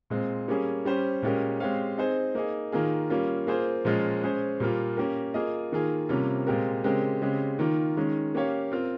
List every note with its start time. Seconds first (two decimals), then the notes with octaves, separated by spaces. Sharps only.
0.10 A#2 G#3 C4
0.48 G3 A#3 C#4 G#4
0.85 G3 C#4 G4 C5
1.22 A#2 G#3 C#4 G4 A#4
1.60 G#3 C4 G4 C#5 F5
1.98 C4 D#4 G#4 C5
2.35 A#3 D#4 G#4
2.72 D#3 A#3 F4 G#4
3.10 G3 A#3 C#4 F4
3.47 A#3 F4 G#4 C5
3.85 A#2 F3 G#3 C#4 F4
4.22 G#3 C#4 G#4 C5
4.60 A#2 G3 A#3 F4
4.97 A#3 C#4 G4 A#4
5.34 A#3 F4 G#4 D#5
5.72 D#3 A#3 F4 G#4
6.09 C3 G3 A#3 C#4 F4
6.47 A#2 G#3 C4 G4 A#4
6.84 C#3 G#3 C4 G4 A#4
7.22 C#3 G#3 C4 G4
7.59 D#3 A#3 F4
7.97 D#3 G#3 C#4
8.34 A#3 C#4 G4 C#5 F5
8.72 C4 F4 A#4